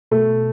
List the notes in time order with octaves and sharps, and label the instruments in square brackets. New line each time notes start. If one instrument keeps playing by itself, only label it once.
[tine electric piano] B2 [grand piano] A3